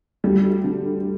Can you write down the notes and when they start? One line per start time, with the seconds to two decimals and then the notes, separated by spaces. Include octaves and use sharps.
0.24 D2 G3
0.64 D3